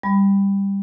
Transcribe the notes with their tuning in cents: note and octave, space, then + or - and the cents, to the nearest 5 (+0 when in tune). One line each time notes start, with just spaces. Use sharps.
G3 +10 B5 +10